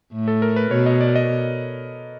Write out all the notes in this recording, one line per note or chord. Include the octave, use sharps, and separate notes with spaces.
A2
A4
A#4
B4
B2 C#5
D#5
D5
D#5